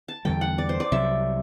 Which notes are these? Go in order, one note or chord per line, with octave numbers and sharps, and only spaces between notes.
A5
E2 D3 G3 G5
F#5
D5
C5
D5
C2 C3 F#3 E5